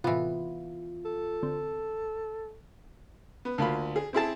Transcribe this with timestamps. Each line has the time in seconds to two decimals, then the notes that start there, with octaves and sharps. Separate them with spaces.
0.04 A2 C3 E3 B3 F4
1.05 A4
1.43 D3 C4
3.45 B3
3.58 D2 A#3 F4 B5
3.96 G#4
4.13 C4 E4 G#4 A5